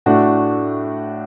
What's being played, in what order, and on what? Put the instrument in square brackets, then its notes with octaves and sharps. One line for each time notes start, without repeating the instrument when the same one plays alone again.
[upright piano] A2 A3 D4 F#4